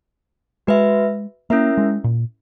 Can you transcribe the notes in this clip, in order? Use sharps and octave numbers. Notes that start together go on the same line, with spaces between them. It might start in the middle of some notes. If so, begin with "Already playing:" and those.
G#3 F#4 B4 E5
A#3 C#4 E4 A#4 E5
G#3
A#2